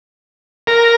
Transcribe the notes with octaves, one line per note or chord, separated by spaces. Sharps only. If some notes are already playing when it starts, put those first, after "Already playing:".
A#4